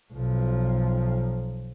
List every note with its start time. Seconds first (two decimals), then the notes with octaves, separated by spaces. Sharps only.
0.13 B1 F3